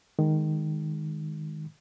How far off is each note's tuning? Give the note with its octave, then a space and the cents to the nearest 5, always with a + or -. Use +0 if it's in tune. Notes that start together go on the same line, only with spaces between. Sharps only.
D#3 +0 G#3 +0